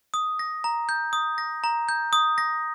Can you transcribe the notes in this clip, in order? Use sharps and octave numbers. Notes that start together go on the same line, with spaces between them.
D#6
A#6
A#5
G6
D#6
A#6
A#5
G6
D#6
A#6